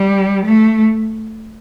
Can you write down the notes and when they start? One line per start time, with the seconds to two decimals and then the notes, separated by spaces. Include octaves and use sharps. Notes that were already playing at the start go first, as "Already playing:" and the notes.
Already playing: G3
0.46 A3